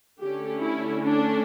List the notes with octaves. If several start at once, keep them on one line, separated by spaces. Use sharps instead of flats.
D3 A3 C#4 G4
E4
D4